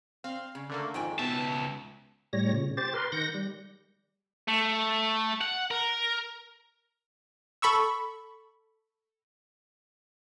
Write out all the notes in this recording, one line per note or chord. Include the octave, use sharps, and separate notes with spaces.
C4 F5
C#3
D3 A3 A#3
F2 G#2 D#3 G5 G#5
C#2 B2 B3 E5 A5
A2 G3 C#5 A#6
A#2 C#3
G4 C5 A6
A#4 B4 C6
D#3 F#5 G6 A#6
G3
A3
F#5
A#4
A4 B5 C#6 E6